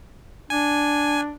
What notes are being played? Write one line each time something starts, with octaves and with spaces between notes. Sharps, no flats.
D4 G#5